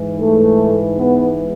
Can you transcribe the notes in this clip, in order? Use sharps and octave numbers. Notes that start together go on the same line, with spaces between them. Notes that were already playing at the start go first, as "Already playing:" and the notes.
Already playing: G#2 E3
A3
B3